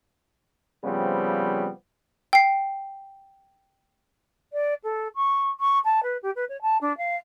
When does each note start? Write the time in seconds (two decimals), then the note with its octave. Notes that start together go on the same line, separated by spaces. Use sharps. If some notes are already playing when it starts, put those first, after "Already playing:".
0.85 C#3 F3 G3 B3 C4
2.33 G5 C7
4.53 D5
4.83 A4
5.15 C#6
5.60 C#6
5.84 A5
6.03 B4
6.22 G4
6.36 B4
6.49 C#5
6.62 A5
6.81 D4
6.97 F5